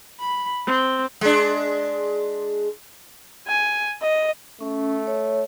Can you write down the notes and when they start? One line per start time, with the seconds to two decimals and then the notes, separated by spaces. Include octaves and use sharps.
0.20 B5
0.66 C4
1.21 G#3 D4
3.47 G#5
4.02 D#5
4.61 A3 C#4
5.07 C#5